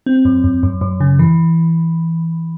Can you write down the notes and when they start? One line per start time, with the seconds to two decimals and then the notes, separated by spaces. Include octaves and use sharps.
0.06 C4
0.25 F#2
0.44 F#2
0.63 F#2
0.81 F#2
1.00 C#3
1.19 E3